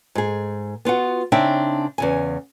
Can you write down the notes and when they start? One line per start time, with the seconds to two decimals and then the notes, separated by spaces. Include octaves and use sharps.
0.15 G#2 G#4
0.85 B3 F4 F#4 F#5
1.32 C#3 C4 D4 D#4 E5 G5
1.98 E2 C#3 G#5